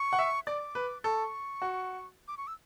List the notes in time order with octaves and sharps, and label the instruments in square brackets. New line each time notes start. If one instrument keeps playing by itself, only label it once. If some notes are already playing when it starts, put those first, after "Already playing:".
Already playing: [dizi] C#6
[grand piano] F#5
E5
[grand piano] D5 [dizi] D6
[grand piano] B4
[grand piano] A4 [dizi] C#6
[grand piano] F#4
[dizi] D6
C#6
E6